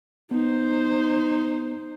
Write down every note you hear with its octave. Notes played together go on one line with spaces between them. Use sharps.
B3 D#4 C5